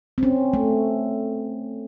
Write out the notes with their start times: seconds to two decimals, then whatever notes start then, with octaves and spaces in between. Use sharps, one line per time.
0.18 C4
0.23 C#4
0.53 A3